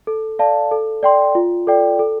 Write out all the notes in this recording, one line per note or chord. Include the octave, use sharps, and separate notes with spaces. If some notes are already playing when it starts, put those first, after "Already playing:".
A4
D5 F5 A5
A4
D5 G5 C6
F4
A4 D5 G5
A4